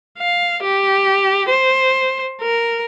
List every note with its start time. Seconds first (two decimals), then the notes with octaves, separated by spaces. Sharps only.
0.18 F5
0.63 G4
1.49 C5
2.41 A#4